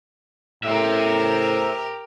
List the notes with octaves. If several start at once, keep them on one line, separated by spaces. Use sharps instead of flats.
A2 G4 A#4 C5 E5